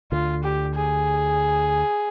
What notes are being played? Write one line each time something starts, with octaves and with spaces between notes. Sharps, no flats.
D2 D3 F4
G4
G#4